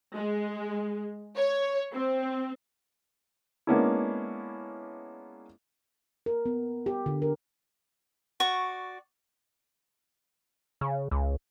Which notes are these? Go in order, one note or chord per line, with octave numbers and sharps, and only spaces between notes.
G#3
C#5
C4
G#3 A#3 B3 C#4 D4 E4
A#4
B3
G4
D3
A#4
F#4 D5 C#6
C#3
C#2